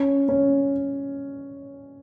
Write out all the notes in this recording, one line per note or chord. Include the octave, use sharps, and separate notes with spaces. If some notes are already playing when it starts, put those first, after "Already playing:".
Already playing: C#4
C#4